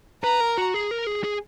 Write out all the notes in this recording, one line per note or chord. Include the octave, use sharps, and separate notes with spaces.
B4 A#5
A#4
F#4
G#4
A#4
G#4
G#4